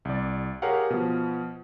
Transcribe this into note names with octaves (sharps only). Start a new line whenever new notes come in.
C2 D5
G4 G#4 A#4 C#5 F5 F#5
B2 F3